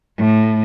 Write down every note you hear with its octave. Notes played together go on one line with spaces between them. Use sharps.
A2